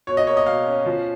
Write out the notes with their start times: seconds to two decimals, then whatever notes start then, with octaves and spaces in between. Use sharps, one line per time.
0.07 B2 C#5
0.17 D#5
0.27 A#3 C#5
0.37 D#5
0.46 B2 F5
0.66 C#4
0.86 F3